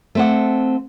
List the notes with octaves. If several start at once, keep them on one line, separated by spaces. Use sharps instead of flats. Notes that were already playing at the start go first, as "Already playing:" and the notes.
A3 C4 F#5